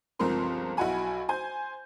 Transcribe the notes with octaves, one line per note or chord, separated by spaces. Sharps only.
G1 C#2 F3 C4 A#4 C6
B1 E4 F#4 F#5 G#5 B5
C5 G#5 G6